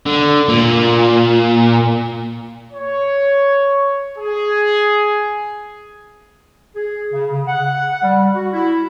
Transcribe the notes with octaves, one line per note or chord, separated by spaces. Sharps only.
D3
A#2
C#5
G#4
G#4
C#3
C#3
F#5
G3
F#4
E4